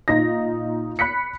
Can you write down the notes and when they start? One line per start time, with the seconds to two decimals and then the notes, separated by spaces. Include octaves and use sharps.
0.08 A#2 D#4 F4 A#6
0.99 B5 F#6 B6 C#7